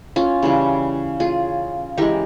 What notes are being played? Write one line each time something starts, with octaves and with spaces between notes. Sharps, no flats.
C#4 F4
C#3 E3 G3
F4 G#4
E3 G#3 G4 A#4